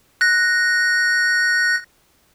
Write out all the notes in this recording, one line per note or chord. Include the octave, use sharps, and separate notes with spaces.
F#6 A#6